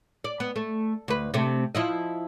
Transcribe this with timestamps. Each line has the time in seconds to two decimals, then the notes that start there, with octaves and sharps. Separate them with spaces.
0.24 D5
0.40 B3
0.56 A3
1.08 D2 B4
1.34 C3 A3
1.75 F3 E4 D#5